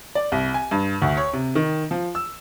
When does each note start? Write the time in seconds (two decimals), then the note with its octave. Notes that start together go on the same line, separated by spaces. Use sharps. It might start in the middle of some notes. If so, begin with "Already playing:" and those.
0.15 D5
0.32 C2
0.54 G#5
0.71 G2
1.02 D2
1.17 C#5
1.33 C3
1.55 D#3
1.91 F3
2.15 E6